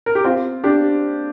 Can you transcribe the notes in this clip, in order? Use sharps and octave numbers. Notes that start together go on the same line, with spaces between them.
A#4
G4
C4 F4
D4 G4